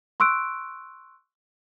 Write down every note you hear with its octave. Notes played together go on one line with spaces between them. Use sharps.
C6 C#6 E6 F#6 D7